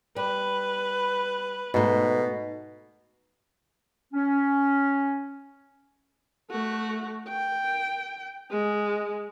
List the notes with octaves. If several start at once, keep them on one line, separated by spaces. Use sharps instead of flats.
G3 B4
G#2 B2 A3
C#4
A3 F#4
G5
G#3